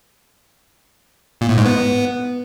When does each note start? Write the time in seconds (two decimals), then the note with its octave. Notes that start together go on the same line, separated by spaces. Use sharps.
1.41 A#2
1.49 A2
1.57 G#2
1.66 B3